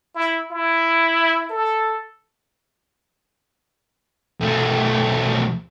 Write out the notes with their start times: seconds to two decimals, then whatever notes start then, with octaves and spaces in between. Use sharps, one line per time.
0.15 E4
0.51 E4
1.50 A4
4.41 B1 A3